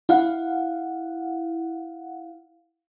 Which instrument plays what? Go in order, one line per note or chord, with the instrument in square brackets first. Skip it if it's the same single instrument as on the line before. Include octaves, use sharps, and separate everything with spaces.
[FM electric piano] E4 F5 F#5